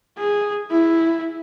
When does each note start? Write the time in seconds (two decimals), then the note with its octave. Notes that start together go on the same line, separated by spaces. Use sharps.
0.18 G#4
0.71 E4